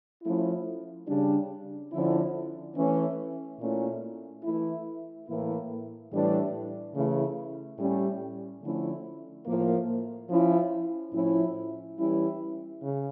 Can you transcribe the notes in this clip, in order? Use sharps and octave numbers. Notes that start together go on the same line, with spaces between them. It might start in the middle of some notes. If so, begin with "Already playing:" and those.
F3 A3 C#4 E4
C#3 G3 D4
D3 F3 C#4 E4
E3 A3 C#4
A#2 A3 C#4 E4
E3 A3 E4
A2 E3 A#3 E4
A2 E3 G3 D4
C#3 E3 A3 E4
A2 G3 C#4
D3 F3 A3 C#4 E4
A2 F3 A#3
F3 C#4 E4
A2 F3 C#4 E4
E3 G3 C#4 E4
C#3